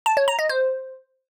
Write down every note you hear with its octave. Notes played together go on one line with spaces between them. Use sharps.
A5
C#5
A#5
D#5
C5